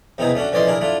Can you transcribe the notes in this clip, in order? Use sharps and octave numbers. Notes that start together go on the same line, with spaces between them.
E2 C3 B3 D#4 E4 G#4
A3 C#4 D4 F#4
F2 E3 C#4 D5 D#5 C6
D4 E4 G#4 A#4
A3 D4 E4 F4